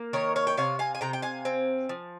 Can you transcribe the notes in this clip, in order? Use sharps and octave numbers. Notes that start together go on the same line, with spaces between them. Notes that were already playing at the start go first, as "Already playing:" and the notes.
Already playing: A#3
D#3 A#4 C#5
C#5 F5
G5
C3 C#5 F5
F5 G#5
G#5
C3 G5 A#5
G5
F5 G#5
C4
F3